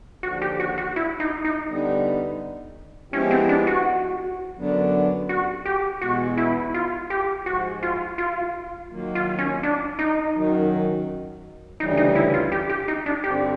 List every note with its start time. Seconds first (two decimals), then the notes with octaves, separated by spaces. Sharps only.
0.23 D#2 D3 F3 F#4
0.42 G4
0.60 F#4
0.78 F#4
0.96 E4
1.20 D#4
1.45 D#4
1.68 D3 G3 B3 D#4
3.12 F3 G#3 B3 C#4 E4 G4
3.31 C4
3.49 D4
3.67 F#4
4.57 F#2 D3 F#3 B3 D4
5.29 F#4
5.65 G4
6.01 E2 B2 G#3 B3 F#4
6.37 E4
6.74 F4
7.10 G4
7.46 G#2 F3 G#3 F#4
7.83 F4
8.18 F4
8.91 D#3 F#3 A#3
9.15 F4
9.39 C#4
9.63 D4
9.99 D#4
10.35 F#2 D#3 F#3
11.80 D2 C#3 E3 G3 D#4
11.97 D#4
12.15 E4
12.34 F4
12.52 G4
12.69 G4
12.88 D#4
13.06 D4
13.24 G2 D3 G3 C4 G4